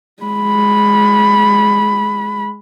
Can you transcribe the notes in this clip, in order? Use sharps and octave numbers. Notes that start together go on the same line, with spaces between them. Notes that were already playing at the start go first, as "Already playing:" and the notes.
G#3 B5